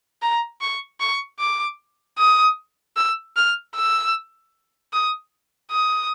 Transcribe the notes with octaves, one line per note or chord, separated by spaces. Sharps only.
A#5
C#6
C#6
D6
D#6
E6
F6
E6
D#6
D#6